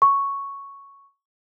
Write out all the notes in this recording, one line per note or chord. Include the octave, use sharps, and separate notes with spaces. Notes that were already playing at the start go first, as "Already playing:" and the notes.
C#6